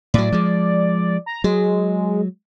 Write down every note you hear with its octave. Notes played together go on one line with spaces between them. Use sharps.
A2 F#3 D5
F3 G#3
A#5
F#3 G#3